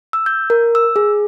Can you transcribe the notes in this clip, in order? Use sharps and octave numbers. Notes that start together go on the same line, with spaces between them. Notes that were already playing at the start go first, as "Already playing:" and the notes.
E6
G6
A#4
E6
G#4